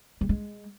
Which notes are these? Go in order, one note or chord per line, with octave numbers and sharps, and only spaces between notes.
G3
G#3